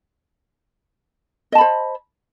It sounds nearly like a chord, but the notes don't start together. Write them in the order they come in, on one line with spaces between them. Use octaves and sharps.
D#5 A5 B5 C5